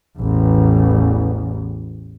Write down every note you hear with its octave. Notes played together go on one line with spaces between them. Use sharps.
A1 E2